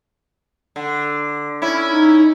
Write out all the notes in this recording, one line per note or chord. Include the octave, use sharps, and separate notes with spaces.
D3
C#4 E4
D#4